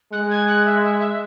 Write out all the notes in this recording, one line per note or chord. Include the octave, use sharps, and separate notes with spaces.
G#3 F#6
G#6
F#6
E5
E5
E5